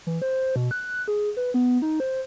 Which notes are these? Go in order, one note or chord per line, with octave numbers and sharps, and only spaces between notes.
E3
C5
B2
F#6
G#4
B4
B3
D#4
C5